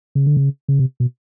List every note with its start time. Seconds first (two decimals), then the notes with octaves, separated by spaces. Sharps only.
0.15 C#3
0.26 D3
0.37 C#3
0.68 C#3
0.79 C3
1.00 B2